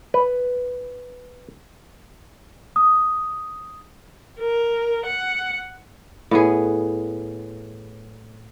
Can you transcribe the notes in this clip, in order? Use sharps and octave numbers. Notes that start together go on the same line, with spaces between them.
B4
D#6
A#4
F#5
A2 B3 G#4